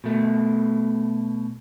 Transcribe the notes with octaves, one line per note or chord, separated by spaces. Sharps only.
B2 A3